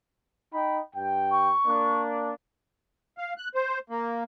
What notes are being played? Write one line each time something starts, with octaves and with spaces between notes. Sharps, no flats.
D#4 G5 B5
G2 G5
C#6
A#3 D4
F5
F#6
C5
A#3